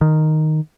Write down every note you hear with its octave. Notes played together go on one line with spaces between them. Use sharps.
D#3